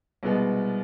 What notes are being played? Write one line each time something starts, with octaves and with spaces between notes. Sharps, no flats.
C2 B2 G#3 B3